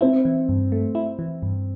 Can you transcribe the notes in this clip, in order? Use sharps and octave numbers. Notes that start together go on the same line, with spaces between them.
C4 E4
E3
G2
A3
E4
E3
G2